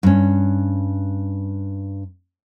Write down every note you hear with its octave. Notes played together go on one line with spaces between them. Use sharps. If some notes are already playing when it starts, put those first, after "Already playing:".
G2 C#4